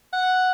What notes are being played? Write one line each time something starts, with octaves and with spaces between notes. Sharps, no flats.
F#5